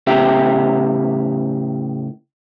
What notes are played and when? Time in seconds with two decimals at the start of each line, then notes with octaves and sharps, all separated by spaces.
0.07 A2 C#3 G4 E5 G5